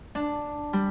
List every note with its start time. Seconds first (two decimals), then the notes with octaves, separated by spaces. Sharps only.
0.15 D4
0.73 G3